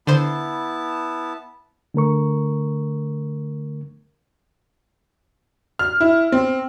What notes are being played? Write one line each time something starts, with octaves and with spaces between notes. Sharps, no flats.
D3 B3 E4 C5 A5
D3 A3 A#4 C#6
F6
E4
C4